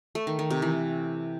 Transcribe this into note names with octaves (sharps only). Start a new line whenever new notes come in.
A3
D#3
D#3
C3
E3